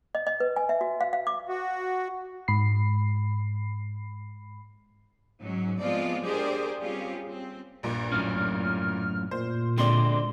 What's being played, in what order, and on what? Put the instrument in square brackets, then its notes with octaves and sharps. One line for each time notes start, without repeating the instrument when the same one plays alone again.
[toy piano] D#5
D#5
B4
G#5
E5
F#4
F5
F5
D6
[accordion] F#4
[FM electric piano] G#2 B5 C7
[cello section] G#2 F#3 C#4
F3 G#3 B3 C4 F4 D5
D4 G4 G#4 A#4 C5 D5
G3 C4 C#4 F4 G4 G#4
C4
[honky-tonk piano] A#1 G2 A#2
[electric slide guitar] F#2 A2 C#4 [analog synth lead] F6
[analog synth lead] A#2 [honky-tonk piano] C5
[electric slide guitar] D3 G#3 A3 [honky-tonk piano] C4 D5 [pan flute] C6